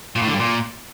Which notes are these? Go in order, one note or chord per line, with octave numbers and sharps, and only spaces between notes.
A#2
A2
D3
G2
A#2